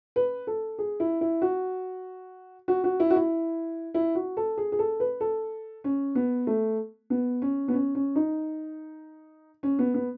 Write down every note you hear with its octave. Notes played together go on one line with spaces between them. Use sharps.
B4
A4
G#4
E4
E4
F#4
F#4
F#4
E4
F#4
E4
E4
F#4
A4
G#4
G#4
A4
B4
A4
C#4
B3
A3
B3
C#4
B3
C#4
C#4
D#4
C#4
B3
B3